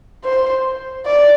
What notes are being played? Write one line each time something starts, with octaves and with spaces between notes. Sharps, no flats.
C5
D5